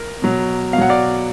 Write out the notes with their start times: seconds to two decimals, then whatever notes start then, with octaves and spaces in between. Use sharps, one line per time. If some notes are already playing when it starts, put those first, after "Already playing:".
Already playing: A#4
0.22 B2 F#3
0.73 B2 F5
0.78 F#3 F#5
0.89 D5 F5